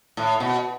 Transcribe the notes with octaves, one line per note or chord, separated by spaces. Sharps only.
A2
B2